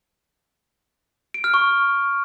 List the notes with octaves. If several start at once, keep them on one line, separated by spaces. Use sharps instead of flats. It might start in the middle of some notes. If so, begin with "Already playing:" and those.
D7
F6
C#6